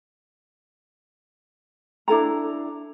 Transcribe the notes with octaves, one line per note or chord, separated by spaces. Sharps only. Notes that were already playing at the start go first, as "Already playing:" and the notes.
D4 E4 A4 A#5